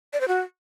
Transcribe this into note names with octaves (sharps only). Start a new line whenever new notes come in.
D5
C5
F#4